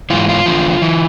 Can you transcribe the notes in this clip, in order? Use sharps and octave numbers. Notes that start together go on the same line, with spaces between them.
G#2 E3 F4
F4
E2 D3 F3
E3